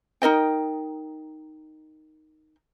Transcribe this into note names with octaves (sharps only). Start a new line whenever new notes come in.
D#4 A#4 D#5 G5